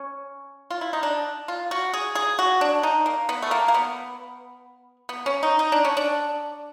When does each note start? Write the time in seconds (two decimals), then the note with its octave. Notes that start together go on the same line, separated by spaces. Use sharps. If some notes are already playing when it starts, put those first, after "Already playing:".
Already playing: C#4
0.70 F4
0.81 E4
0.93 D#4
1.03 D4
1.48 F4
1.71 F#4
1.93 G#4
2.15 G#4
2.39 F#4
2.61 D4
2.83 D#4
3.06 A#3
3.29 B3
3.42 A3
3.51 A#3
3.68 A#3
3.74 B3
5.09 B3
5.26 C#4
5.43 D#4
5.59 D#4
5.72 D4
5.85 C#4
5.97 D4